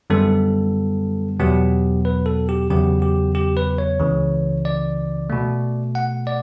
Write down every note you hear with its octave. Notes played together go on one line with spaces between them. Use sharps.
F#2 D3 G3 B3 A4
E2 B2 F#3 B3 G4
B4
A4
G4
E2 C#3 F#3 B3 G4
G4
G4
B4
C#5
C#2 C#3 E3
D5
B2 A3
F#5
D5